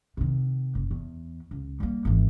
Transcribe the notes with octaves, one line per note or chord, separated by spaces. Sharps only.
C3 D#3
F#1
E2
C#2
G3 A#3
G#1 E3